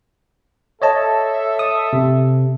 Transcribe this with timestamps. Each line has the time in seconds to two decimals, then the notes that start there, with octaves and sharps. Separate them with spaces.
0.82 A4 C#5 D#5 E5 A5
1.59 D#6
1.93 C3